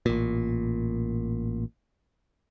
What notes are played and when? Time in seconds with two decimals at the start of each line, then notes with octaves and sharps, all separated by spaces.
0.06 A1 A#2